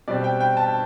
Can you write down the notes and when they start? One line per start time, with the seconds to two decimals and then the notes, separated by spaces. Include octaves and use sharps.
0.08 B2 G3 C4 D5
0.24 G5
0.40 G5
0.57 A5